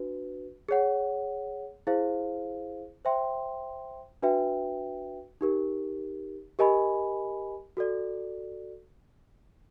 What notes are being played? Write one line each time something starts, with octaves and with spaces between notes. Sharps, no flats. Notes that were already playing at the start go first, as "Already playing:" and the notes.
Already playing: D4 F#4 B4
G#4 C#5 F#5
E4 G#4 C5 F5
C5 E5 G5 C6
D4 F#4 B4 E5 G5
D#4 G4 A#4
G4 A#4 D#5 G#5 B5
F#4 A4 D5